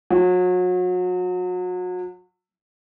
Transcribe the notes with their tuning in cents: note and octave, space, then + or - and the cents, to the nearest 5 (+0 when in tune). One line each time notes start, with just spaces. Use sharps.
F#3 -35